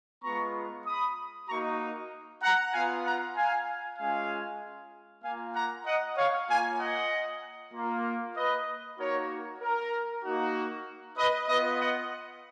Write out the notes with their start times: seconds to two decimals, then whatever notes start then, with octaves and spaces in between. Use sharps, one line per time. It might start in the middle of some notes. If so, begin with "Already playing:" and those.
0.23 G#3 B3 F4 A#5 C#6
0.86 B5 D#6
1.48 A#3 D#4 F#4 A#5 C#6
2.42 F#5 A#5
2.73 B3 F4 F5 G#5
3.05 F#5 A#5
3.36 F5 G#5
3.98 G#3 C#4 F4 F5 G#5
5.23 A#3 F4 F5 G#5
5.55 F#5 A#5
5.86 D#5 F#5
6.17 C#5 F5
6.48 A#3 F4 F5 G#5
6.80 D#5 F#5
7.73 A#3 F4
8.36 B4 D#5
8.98 A#3 D#4 F#4 A#4 C#5
9.61 A#4
10.23 A#3 D#4 F#4
11.17 B4 D#5
11.48 B3 F4 B4 D#5
11.80 D#5 F#5